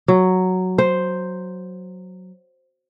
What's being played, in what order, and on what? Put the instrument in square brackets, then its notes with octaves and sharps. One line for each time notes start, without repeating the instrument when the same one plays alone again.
[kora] F#3
C5